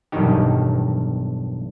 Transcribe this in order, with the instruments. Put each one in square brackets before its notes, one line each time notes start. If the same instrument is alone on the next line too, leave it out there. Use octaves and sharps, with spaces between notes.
[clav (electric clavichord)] B1 E2 G2 D#3 D#4 G4